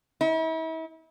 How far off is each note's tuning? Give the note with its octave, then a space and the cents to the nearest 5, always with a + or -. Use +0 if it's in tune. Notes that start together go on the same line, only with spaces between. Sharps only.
E4 -40